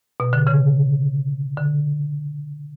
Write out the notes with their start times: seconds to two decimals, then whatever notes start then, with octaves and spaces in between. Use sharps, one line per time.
0.20 B2
0.33 D3
0.47 C#3
1.57 D3